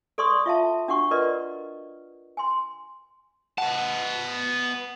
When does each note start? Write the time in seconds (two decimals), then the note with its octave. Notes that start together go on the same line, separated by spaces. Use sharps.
0.18 A4 D5 C6 C#6 D#6
0.46 F4 E5 F5 A5
0.88 D4 F#4 F#5 C#6
1.11 F4 A#4 B4 D5 D#5
2.37 G#5 C6
3.58 B3 F#5 A5